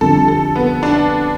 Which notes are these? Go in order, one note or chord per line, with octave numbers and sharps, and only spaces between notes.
F2 D3 G3 A4
A4
B3
D4